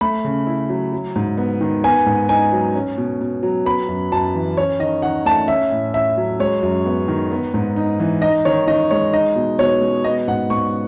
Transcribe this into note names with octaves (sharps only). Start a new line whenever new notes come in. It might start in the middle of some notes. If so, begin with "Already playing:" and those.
A3 B5
C#3
E4
F#3
F#3
G#2
B3
D#3
B3 G#5
G#2
D#4 G#5
F#3
C#4
B2
B2
F#3
B3 B5
F#2
F#2 A5
E3
C#4 C#5
D#3 D#5
D#3 F#5
A3 A5
C#4 E5
A2
E4 E5
F#3
G#3 C#5
F#2
B3
D#3
B3
G#2
D#4
E3
D#4 D#5
D#3 C#5
D#3 D#5
G#3 C#5
D#4 D#5
B2
B2 C#5
G#3
B3 D#5
G#2 F#5
G#2 C#6